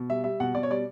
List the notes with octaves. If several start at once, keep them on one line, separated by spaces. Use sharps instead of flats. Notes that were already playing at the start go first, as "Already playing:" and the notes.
Already playing: B2
G3 E5
G3 E5
B2 F#5
B2 D5
C#5
G3 D5